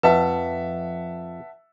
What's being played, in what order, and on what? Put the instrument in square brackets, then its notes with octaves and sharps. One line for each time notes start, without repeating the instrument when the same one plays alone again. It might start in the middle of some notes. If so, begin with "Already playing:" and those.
[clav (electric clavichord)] F2 [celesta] B4 [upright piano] E5 F#5 A5